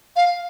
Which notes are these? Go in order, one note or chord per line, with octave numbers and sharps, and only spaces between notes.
F5